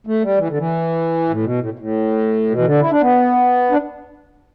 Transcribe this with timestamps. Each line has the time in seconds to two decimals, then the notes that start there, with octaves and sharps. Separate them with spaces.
0.07 A3
0.23 G3
0.37 E3
0.48 D3
0.58 E3
1.29 A2
1.43 B2
1.59 A2
1.79 A2
2.50 B2
2.58 E3
2.65 D3
2.81 E4
2.91 D4
3.01 B3
3.71 D4